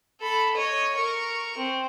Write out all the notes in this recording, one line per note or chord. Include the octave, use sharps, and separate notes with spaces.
A4 B5
C#5 D#5
A#4 C#6
C4